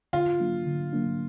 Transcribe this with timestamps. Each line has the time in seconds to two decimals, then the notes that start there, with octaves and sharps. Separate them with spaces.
0.13 D3 F4
0.40 F#3 A#3 D4
0.66 D3
0.93 F#3 A#3 D4